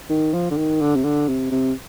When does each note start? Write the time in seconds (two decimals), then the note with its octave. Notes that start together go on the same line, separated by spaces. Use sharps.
0.09 D#3
0.33 F3
0.50 D3
0.57 D#3
0.81 D3
0.95 C3
1.04 D3
1.28 C3
1.51 C3